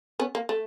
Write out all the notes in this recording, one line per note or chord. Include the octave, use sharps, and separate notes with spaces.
B3 C#4
A#3
A3